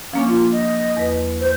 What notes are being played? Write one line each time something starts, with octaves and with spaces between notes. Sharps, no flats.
F3 A#3 C#4 D4
F4
D#5
E2 B4
C5